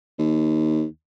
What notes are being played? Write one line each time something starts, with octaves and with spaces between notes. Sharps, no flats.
D#2